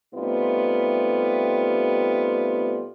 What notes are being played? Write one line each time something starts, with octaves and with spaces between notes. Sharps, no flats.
C3 G3 A3 B3 D#4 F4